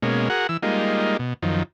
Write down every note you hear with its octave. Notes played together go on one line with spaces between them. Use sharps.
B2 G#3 A#3 C#4
F#4 G#4 A#4 F#5
E3 E6
G3 G#3 A#3 D#4 F4
B2
F#2 D#3 F3